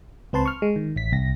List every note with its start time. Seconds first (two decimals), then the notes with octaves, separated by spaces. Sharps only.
0.33 C#2 C4 B4 C5 A5 C6
0.46 C#6 F6
0.62 G#3
0.76 D#3
0.96 A1 B6
1.12 C2 A#6